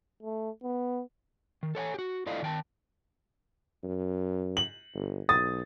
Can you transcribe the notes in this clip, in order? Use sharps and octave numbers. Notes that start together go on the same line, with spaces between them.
A3
B3
D#3
A4 C#5 F#5 G#5
F#4 G4
E4 F4 A4 D5 D#5 F5
D#3 G5 A5
F#2
F#7
G1
B1 D#6 A6